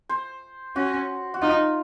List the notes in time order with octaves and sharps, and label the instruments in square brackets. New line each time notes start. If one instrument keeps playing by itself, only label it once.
[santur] C5
[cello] C#4 [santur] F#4
[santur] F#4
[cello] D#4 [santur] F4